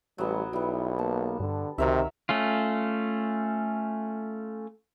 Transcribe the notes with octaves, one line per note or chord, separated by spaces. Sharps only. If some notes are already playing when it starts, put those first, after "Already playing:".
A1 F#3 G3 B3
B1 G3 B3 E4
A#3 A5
G2 D3
C#2 C3 D#3 F#3 A#4 E5
A3 C#4 F4